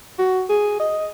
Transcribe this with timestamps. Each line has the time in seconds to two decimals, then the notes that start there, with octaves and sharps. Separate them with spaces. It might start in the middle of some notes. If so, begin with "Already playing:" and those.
0.19 F#4
0.49 G#4
0.79 D#5